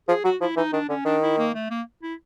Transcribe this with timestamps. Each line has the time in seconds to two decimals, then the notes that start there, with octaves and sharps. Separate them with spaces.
0.08 F3 G#4
0.24 F#3 F#4
0.41 F3 E4
0.57 E3 D#4
0.73 D#3 D4
0.89 D3 C#4
1.05 D#3 D4
1.22 E4
1.38 A#3
1.54 A3
1.70 A#3
2.03 E4